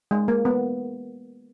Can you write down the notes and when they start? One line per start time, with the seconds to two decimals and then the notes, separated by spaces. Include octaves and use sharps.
0.11 G#3
0.28 A#3
0.45 B3